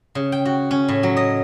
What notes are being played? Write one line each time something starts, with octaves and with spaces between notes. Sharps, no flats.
C#3
G5
F#4
C#4
A2
F#3
D#5